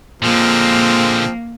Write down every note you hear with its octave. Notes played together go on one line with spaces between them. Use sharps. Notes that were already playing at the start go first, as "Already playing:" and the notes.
A#2 D3 F3 G#3 A#3 C4